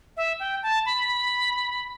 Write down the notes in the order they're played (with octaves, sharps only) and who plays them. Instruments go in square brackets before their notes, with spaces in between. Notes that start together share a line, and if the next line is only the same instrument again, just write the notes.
[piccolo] E5
G5
A5
B5